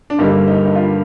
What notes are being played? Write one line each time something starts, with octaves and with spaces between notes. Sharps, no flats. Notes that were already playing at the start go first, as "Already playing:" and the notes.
D4
G2 D3 G3 A#3 D#4
D#4
D#4
F4